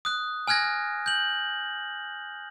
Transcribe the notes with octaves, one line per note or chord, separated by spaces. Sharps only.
D#6 F#6
G#5 F6 F#6 G#6 A#6
G6 F#7